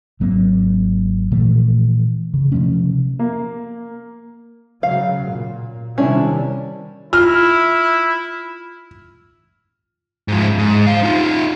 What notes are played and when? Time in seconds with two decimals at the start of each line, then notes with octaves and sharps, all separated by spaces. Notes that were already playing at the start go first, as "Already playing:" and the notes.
0.20 G#1 F#3 A#3 C4
1.31 A#2 E3 F3 A3
2.34 C#3
2.52 C3 F3 A3 C#4
3.19 A#3
4.83 C#3 F#3 F5
5.29 A#2
5.98 C3 D#3 G3 C#4 D4 E4
7.13 E4 F4 F6
10.28 G#2 F3
10.58 G#2
10.87 C5 F5
11.03 D#4 F4